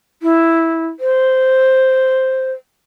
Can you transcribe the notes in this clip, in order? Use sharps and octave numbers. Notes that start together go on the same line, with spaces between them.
E4
C5